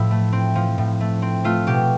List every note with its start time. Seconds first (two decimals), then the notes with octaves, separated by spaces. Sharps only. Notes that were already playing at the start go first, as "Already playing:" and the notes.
Already playing: A2 F3 E4
0.11 A3
0.33 C4
0.55 F3
0.78 A2
1.01 A3
1.22 C4
1.44 A3 F4
1.67 B2 G4